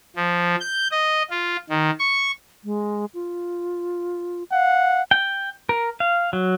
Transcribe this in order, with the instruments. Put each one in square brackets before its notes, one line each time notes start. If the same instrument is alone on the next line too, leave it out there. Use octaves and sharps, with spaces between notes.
[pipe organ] F3
G6
D#5
F4
D#3
C#6
[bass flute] G#3
F4
[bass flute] F5 [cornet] F#5
[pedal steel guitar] G5
A#4
F5
F#3